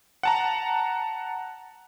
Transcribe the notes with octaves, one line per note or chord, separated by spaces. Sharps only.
F#5 A5 A#5